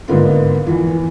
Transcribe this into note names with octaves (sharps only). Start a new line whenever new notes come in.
G#2 D3 A#3 B3 F4
E2 E3 F3